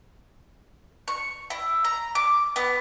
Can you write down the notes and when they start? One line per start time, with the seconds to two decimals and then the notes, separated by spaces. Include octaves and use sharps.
1.08 C#6
1.50 E4
1.85 A#5
2.15 D6
2.56 B3